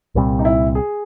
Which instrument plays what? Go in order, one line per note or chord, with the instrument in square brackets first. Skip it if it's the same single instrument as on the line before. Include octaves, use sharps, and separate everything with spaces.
[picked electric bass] C2 A#2 G3 C4
[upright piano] D#4
E4
G#4